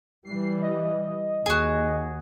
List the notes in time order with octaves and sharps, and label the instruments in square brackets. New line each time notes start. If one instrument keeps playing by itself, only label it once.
[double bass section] E3 G3 [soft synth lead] C7
[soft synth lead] D#5
[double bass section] D#2 [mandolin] F#4 G#4